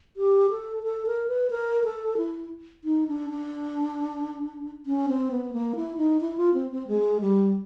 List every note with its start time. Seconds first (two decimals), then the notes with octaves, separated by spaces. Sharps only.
0.17 G4
0.50 A4
0.84 A4
1.07 A#4
1.28 B4
1.50 A#4
1.84 A4
2.17 E4
2.84 D#4
3.08 D4
3.30 D4
4.86 C#4
5.09 C4
5.31 B3
5.53 A#3
5.76 E4
5.97 D#4
6.21 E4
6.37 F4
6.54 C4
6.71 C4
6.88 G#3
7.21 G3